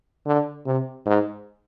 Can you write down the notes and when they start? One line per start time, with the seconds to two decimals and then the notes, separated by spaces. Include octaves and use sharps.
0.26 D3
0.66 C3
1.06 G#2